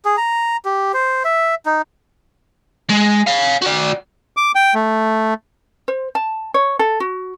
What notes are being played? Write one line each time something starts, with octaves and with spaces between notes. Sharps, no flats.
G#4
A#5
G4
C5
E5
D#4
G#3
C#5 F5
F#4 D5
D6
G5
A3
C5
A5
C#5
A4
F#4